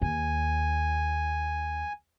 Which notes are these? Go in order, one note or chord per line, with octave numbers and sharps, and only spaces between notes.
D#2 G#5